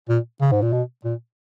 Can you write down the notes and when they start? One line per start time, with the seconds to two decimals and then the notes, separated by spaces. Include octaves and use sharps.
0.09 A#2
0.41 C#3
0.52 G#2
0.62 A#2
0.73 B2
1.05 A#2